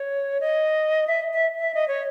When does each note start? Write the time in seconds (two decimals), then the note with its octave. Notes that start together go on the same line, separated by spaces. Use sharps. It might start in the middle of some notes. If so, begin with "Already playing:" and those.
Already playing: C#5
0.41 D#5
1.07 E5
1.33 E5
1.59 E5
1.74 D#5
1.88 C#5